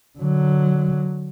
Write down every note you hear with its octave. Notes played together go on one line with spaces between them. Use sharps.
D3 F#3